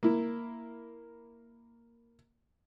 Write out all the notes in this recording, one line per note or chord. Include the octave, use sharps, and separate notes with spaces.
A#3 E4